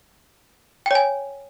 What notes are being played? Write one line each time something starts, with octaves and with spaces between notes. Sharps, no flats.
C#5 G5 G#5